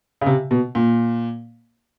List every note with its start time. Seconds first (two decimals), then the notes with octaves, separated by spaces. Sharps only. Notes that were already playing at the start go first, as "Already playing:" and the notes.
0.21 C#3
0.26 C3
0.51 B2
0.75 A#2